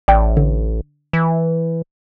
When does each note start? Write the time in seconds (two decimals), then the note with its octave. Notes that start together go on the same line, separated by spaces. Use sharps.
0.08 A1 D5 G5
0.37 D3
1.13 E3